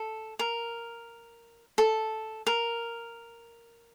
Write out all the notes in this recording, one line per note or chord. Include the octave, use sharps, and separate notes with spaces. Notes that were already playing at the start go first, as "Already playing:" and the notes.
Already playing: A4
A#4
A4
A#4